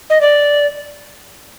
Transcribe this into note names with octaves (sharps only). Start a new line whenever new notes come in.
D#5
D5